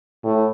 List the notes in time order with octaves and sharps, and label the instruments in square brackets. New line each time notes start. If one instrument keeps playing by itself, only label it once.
[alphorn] A2